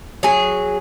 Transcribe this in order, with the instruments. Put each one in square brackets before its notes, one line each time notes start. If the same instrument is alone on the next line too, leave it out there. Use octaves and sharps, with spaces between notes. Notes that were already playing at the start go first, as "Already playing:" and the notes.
[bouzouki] F#3 G#4